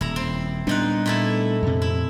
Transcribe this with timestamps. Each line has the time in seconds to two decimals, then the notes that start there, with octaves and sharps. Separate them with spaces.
0.01 D#1 E4 A#5
0.16 C4
0.67 A#2 G3 B3 D4 D#4 F#5
1.06 A#2 A3 E4
1.62 F2 C3
1.82 E4